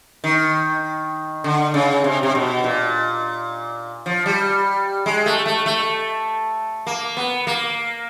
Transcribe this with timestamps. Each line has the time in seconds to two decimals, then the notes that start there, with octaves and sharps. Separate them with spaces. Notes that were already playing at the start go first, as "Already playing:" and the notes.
0.24 D#3
1.44 D3
1.74 C#3
2.04 C3
2.23 C3
2.35 B2
2.64 A#2
4.06 F3
4.26 G3
5.06 G#3
5.26 A3
5.46 A3
5.66 A3
6.87 A#3
7.17 B3
7.47 A#3